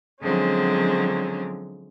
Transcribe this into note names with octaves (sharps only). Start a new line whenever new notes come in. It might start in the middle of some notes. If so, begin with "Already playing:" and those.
D3 F3 F#3 G#3 C4 C#4